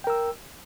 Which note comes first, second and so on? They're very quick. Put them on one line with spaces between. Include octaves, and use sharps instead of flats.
G5 A#4 E6